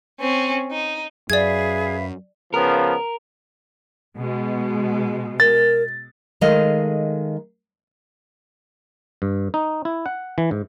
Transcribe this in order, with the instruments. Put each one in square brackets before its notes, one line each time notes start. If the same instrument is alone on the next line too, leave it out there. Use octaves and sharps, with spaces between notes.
[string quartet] C4 C#4
D#4
[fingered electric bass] F#2 [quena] G#4 [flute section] B4 E5 F5 [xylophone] D5 G#6
[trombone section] C#3 F3 B3 [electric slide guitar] A#4
[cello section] B2 G#3
[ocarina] A#4 [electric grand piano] A6
[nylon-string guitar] D#3 G#3 A3 D#5 F5
[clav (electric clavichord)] G2
D#4
E4
F#5
E3
G#2